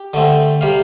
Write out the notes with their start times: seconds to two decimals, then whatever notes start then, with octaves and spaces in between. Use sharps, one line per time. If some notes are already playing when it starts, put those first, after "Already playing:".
Already playing: G4
0.14 D3 A3 C4
0.61 C3 G3 F5